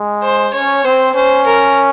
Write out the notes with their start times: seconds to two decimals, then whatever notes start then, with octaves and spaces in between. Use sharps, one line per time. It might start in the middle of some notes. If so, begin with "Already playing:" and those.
Already playing: G#3
0.23 C5
0.54 C#4 C#5
0.85 C4 C5
1.15 C#4 C5
1.46 A#4